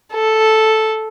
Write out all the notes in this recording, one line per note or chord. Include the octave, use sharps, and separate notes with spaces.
A4